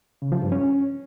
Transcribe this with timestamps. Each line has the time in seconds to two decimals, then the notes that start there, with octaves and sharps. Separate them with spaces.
0.22 C#3
0.32 F3
0.42 G2
0.52 C#4